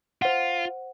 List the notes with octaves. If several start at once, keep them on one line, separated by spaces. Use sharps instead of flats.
F4 C5 F#5